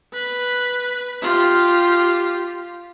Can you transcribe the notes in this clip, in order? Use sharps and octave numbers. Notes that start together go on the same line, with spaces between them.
B4
F4 G4